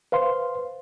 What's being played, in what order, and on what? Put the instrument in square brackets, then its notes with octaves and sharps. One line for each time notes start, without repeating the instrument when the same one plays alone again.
[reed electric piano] B4 F5 C6 [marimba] C5